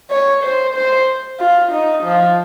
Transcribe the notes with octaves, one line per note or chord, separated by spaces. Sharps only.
C#5
C5
C5
F4
D#4
F3